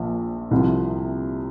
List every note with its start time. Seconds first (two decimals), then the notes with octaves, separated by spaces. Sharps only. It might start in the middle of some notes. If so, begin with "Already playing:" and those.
Already playing: A#1 A#2 F3
0.51 C2 C3 F3